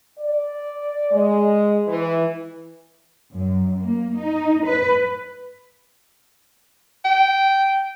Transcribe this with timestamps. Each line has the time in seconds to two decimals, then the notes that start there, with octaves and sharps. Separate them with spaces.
0.19 D5
1.12 G#3
1.87 E3
3.32 F#2
3.80 A#3
4.17 D#4
4.66 B4
7.05 G5